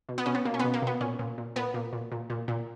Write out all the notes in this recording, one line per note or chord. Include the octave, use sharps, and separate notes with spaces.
B2
B3
B2 C#4
B3
B2 A#3
C#4
B2 B3
A#3
B2 B3
A#2 C#4
A#2
A#2
A#2 B3
A#2
A#2
A#2
A#2
A#2